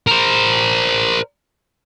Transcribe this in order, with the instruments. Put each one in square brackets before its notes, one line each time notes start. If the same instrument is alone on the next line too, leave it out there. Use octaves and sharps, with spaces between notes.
[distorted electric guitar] A#4 C5